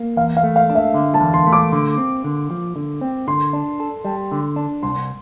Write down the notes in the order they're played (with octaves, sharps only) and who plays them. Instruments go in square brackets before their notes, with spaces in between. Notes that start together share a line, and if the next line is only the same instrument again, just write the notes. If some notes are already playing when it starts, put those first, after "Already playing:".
Already playing: [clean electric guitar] A#3
[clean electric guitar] E2 [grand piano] F5
[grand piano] F5
[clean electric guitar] A3
[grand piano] F5
[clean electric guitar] D4
[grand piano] E5
[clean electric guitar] D3
[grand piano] A5
[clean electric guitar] E2
[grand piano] C6
[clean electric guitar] A3
[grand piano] D6
[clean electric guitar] D3
C4
D3
F3
D3
C4
[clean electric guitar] D3 [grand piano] C6
[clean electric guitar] D4
A4
G3
D3
D4
[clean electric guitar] C2 [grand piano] C6